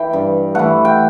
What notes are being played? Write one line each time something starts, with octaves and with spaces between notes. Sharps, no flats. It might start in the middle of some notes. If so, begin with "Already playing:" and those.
Already playing: E3 G5
G2
E3 A3 F#5
G5